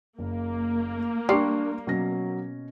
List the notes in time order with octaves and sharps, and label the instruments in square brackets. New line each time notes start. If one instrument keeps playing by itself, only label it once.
[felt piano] F#1 [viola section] A#3
[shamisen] G3 [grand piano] D4 C#6 [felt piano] A#5 C6 C7
[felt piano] B2 C#4 A#6 [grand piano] F#3